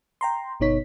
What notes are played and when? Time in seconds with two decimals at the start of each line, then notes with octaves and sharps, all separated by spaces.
0.21 G5 A#5 C6
0.60 G1 B2 B3 D#4 C#5 B6